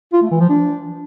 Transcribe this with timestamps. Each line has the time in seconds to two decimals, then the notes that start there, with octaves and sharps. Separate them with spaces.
0.13 F4
0.22 A3
0.31 E3
0.40 F3
0.50 D4